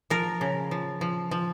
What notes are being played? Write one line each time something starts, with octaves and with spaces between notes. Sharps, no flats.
F3 A#4
C#3
F3
F3
F3